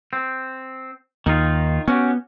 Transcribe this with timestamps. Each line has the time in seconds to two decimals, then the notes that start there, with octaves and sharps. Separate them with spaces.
0.13 C4
1.26 D#2 D#3 D#4 F4
1.88 B3 C#4 F#4 G4